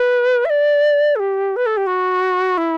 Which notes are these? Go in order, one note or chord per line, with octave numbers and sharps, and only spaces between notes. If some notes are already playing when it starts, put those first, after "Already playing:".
Already playing: B4
E5
D5
A4
G4
B4
A4
G4
F#4
E4